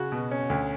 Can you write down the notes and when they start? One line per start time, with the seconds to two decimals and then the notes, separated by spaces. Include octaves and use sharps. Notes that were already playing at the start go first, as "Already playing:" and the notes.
Already playing: C#3 F#4
0.12 B2
0.31 C#4
0.50 D2